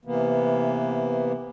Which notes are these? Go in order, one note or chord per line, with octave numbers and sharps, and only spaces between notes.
C3 E3 A#3 B3